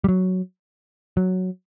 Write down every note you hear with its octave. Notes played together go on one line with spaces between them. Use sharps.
G3
F#3
F#3